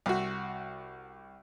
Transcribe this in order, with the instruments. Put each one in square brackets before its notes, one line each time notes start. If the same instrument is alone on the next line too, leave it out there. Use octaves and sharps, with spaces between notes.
[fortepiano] C2 F#4